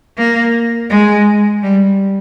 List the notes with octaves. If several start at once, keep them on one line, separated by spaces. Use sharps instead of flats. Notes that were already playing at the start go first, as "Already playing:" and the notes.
A#3
G#3
G3